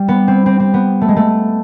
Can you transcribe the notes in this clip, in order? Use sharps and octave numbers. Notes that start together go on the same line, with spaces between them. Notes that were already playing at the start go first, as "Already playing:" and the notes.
Already playing: G3
B3
C4
C4
C4
B3
A3
G#3
A3